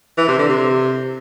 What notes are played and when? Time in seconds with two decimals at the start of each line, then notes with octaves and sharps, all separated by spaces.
0.18 E3
0.28 C3
0.38 D3
0.49 C3